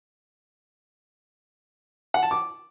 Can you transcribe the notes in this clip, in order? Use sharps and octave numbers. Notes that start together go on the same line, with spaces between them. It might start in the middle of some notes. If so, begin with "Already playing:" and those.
F#5
A5
D6